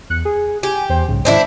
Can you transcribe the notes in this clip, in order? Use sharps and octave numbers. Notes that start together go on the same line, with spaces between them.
E2 F#6 C#7
G#4
G4 G#5
E2 C5 G5
B1 G#2 C#3
G#2 D#3 C4 D4 E4